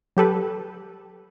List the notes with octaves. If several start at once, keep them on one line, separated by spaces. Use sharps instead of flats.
F#3 G4 A4 B4